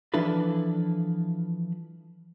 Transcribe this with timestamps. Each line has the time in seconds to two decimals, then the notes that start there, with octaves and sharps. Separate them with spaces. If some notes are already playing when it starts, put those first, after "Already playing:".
0.14 E3 F3 D4 E4 A4 B4